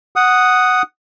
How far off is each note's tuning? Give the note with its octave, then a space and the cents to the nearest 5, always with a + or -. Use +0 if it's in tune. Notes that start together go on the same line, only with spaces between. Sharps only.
F#5 +0 D#6 +0